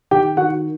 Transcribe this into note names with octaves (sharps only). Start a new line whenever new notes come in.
D#3 G4 G5
D#3 F#4 F#5